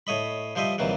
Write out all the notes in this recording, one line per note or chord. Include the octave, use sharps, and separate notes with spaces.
A2 C#5 D#5 B5
F3 G3 C5 D#5 E5
D#2 C3 E3 F#3 G3